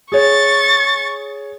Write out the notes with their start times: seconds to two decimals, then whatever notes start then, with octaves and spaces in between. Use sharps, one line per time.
0.12 G#4 C#5 C#6 A6